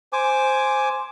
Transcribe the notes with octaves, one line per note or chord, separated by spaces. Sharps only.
C5 G#5 D6